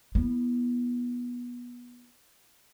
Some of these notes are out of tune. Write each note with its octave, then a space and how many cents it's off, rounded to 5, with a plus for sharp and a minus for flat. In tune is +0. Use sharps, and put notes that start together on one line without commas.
B3 -20 E4 -5